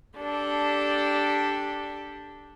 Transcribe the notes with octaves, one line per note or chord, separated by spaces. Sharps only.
D4 G4 A4